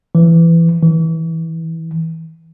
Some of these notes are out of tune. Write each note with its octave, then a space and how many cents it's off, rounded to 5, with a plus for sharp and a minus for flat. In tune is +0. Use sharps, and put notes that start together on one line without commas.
E3 +15
E3 -20